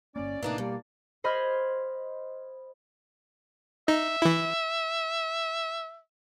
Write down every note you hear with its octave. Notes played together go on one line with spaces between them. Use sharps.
G1 A#3 C#4 D5
A2 C3 E3 A#3 D4 D#4
G2 B2 G3 A#3
C5 D#5 B5 C6 F6 G#6
D#4 E5
E3 E4